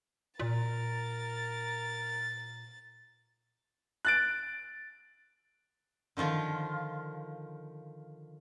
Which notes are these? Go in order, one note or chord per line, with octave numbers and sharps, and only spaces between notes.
A#2 A#4 A6
F#6 A6 D7
D3 D#3 F3 F4